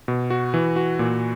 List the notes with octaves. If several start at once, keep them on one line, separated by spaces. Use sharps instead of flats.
B2
F#4
E3
F#4
A#2